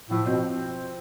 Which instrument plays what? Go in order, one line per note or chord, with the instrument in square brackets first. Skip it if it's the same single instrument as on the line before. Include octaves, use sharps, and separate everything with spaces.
[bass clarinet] A2 [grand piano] F3
[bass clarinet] B2 [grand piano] C4